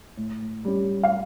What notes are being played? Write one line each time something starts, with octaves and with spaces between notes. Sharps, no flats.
A2
G3 C#4
F5